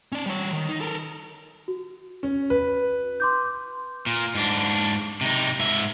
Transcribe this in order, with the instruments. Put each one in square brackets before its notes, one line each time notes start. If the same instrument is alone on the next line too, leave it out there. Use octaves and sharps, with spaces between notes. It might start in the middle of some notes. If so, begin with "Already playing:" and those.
[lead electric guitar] C#4 D5
G3 C#5
D#3
D#4
A4 A#4
[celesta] F#4
[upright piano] C#4
B4
[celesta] C6 D6 G6
[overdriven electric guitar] A#2
G#2 D4
C3 D#4
G#2 E5